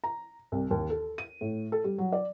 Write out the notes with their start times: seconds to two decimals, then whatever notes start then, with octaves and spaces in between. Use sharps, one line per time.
0.04 A#5
0.52 C2
0.71 D#2
0.90 A4
1.18 D#7
1.41 A2
1.72 A4
1.84 G3
1.98 F#3
2.12 D5